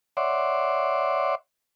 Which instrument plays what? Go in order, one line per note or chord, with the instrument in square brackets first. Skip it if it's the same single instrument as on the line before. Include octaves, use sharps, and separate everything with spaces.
[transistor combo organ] C#5 D5 E5 F#5 C6 D6